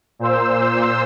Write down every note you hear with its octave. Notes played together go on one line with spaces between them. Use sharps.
A#2 C5 E6